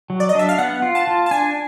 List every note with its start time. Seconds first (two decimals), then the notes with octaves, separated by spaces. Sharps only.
0.10 F#3
0.20 D5
0.29 D#5
0.35 D4 E5
0.49 F5
0.59 B3 F#5
0.82 F4
0.95 A5
1.07 F4
1.26 A5
1.31 D4 G#5